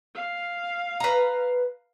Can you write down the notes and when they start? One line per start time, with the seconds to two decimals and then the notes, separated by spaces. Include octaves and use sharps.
0.14 F5
1.00 B4 A#5